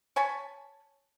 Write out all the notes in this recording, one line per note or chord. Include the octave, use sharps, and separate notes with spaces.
C#5 G#5 A5 B5